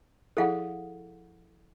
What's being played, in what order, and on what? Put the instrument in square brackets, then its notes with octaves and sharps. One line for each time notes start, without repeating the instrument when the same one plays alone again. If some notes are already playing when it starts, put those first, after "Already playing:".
[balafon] F3 E4 G#4 [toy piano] A4 F5 F#5